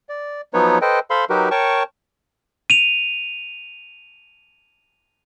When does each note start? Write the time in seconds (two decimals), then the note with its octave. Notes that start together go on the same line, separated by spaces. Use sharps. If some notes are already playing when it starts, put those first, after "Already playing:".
0.09 D5
0.54 F3 F#3 B3 D#4 B4 C#5
0.82 A4 B4 C5 D#5 G5
1.10 A4 C5 F5 B5 C6
1.30 F#3 D#4 F#4 G4 A#4 B4
1.51 A#4 C#5 G5 A5 C#6
2.70 D#7 F7